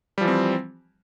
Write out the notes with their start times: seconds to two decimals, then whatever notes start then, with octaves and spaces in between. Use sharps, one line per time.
0.18 G3
0.21 F3
0.24 E3
0.28 C4